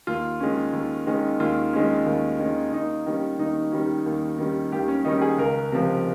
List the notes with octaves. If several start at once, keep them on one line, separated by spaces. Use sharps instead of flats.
D#2 F4
D#3 G#3 C#4
D#2
D#3 G#3 C#4
D#2 F4
D#3 G#3 C#4
D#2
D#3 G#3 C#4
D#2 D#4
D#3 G3 C#4
D#2 D#4
D#3 G3 C#4
D#2
D#3 G3 C#4
D#2 G4
C#4
D#3 G3 C#4 D#4
G#4
C#2 A#4
C3 F3